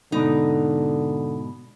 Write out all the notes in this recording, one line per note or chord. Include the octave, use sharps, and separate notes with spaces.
G#2 B2 D3 D#4